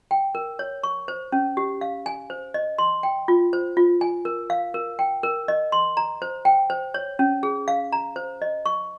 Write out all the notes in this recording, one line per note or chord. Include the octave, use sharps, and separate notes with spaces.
G5
A#4
C#5
C#6
C5
C#4
G4
F5
G#5
C5
D#5
C6
G5
F4
C5
F4
G#5
A#4
F5
A#4
G5
A#4
D#5
C6
A#5
C5
G5
C5
C#5
C#4
G#4
F5
A#5
C5
D#5
C#6